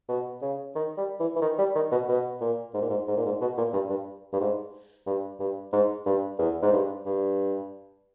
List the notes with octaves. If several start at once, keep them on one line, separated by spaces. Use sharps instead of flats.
B2
C#3
D#3
G3
E3
E3
D#3
G3
D#3
B2
B2
A#2
G#2
A#2
G#2
G#2
A#2
G#2
B2
A#2
G2
G2
G2
G#2
G2
G2
G#2
G2
E2
G#2
G2
G2